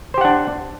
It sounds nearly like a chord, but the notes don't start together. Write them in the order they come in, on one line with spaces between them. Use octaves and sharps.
C5 G4 F#5 D4